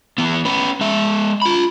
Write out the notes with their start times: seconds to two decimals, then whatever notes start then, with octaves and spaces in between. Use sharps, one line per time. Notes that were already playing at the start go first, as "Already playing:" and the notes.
0.18 E3 B3
0.45 C#4 B4
0.81 G#3 E5
1.42 F4 B5